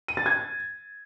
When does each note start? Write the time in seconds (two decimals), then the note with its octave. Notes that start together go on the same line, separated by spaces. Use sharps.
0.08 D#7
0.17 A6
0.26 G#6